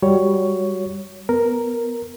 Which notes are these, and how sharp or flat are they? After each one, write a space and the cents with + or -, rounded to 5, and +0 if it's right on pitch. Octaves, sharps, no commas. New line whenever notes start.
G3 +0 F#4 +0 C#5 +10
B3 +5 A#4 +0